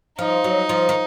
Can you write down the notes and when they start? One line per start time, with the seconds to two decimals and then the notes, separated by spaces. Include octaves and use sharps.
0.19 F3 D#4
0.44 F#3
0.69 F3
0.89 D#3